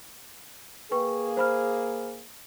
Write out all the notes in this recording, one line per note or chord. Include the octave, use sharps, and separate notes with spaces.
A#3 G#4 B4 G5 C#6
C5 B5 F6